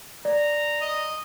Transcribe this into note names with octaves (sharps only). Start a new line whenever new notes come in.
D5 A#5
D#5